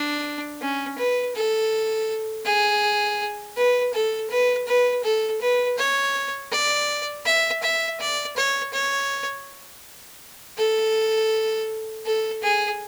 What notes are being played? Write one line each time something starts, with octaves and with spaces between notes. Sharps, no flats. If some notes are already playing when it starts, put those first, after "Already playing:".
Already playing: D4
C#4
B4
A4
G#4
B4
A4
B4
B4
A4
B4
C#5
D5
E5
E5
D5
C#5
C#5
A4
A4
G#4